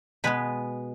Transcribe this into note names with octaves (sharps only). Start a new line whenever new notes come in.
B2 G#3 B3 B4